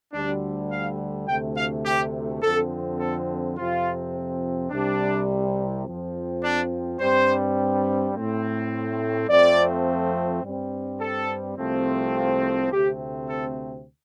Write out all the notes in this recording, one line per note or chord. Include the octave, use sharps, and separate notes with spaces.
D2 D3 G3 D4
F5
D2 C3 A3 G5
F5
G4
F2 D3 F3 C4 A4
A4
F2 C3 F3 C4 F4
C2 C3 G3 D4
F2 F3 C4
D4
G2 G3 C4 C5
A2 A3 C4
F2 F3 A3 C4 D5
G2 G3 C4
A4
C2 C3 F3 A3 C4
F4
D2 C3 A3 C4 G4
A4